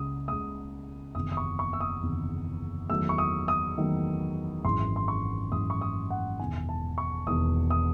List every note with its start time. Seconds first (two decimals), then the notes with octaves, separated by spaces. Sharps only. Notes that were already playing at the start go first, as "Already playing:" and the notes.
Already playing: C#2 C#3 G#3 D#6
0.27 C#2 C#3 G#3 D#6
1.15 F#1 E2 C3 D#3 D#6
1.32 D#6
1.37 C#6
1.59 C#6
1.73 E6
1.80 D#6
2.02 F#1 E2 C3 D#3
2.90 E2 D#3 F#3 A3 E6
3.09 C#6
3.18 D#6
3.48 D#6
3.78 E2 D#3 F#3 A3
4.64 G#1 F#2 E3 G#3 C6
4.96 C6
5.08 C#6
5.52 G#1 F#2 E3 G#3 D#6
5.70 C#6
5.81 D#6
6.10 F#5
6.39 E1 E2 D#3 G#5
6.69 A5
6.98 C#6
7.27 E1 E2 D#3 D#6
7.70 D#6